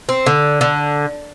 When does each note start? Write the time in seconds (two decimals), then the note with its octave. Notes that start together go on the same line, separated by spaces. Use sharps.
0.09 C4
0.26 D3
0.61 D3